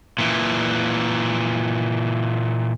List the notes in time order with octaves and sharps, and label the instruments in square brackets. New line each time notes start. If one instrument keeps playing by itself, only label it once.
[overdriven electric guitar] A#2 E3